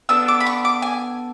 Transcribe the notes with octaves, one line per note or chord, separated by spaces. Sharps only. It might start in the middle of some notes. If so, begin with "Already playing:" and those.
B3 D4 A4 E6
D6
B5
C#6
D6
G#5